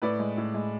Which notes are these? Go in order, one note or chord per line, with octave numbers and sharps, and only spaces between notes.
A2 B4 D5
G#3
A2
G#3